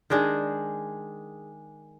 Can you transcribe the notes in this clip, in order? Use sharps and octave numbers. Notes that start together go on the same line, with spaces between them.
D#3 G#3 D4 G#4